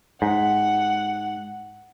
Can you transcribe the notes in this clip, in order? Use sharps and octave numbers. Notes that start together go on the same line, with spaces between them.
G#2 F#5